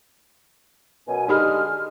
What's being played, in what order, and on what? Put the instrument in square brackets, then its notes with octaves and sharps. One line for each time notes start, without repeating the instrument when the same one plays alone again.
[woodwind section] F#2 B2 G#5
[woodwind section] D3 G#3 F6 [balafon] D#4 G4 B5